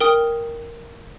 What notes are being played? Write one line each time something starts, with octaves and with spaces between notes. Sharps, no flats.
A#4 G5 D#6